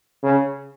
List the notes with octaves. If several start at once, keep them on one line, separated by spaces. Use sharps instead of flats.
C#3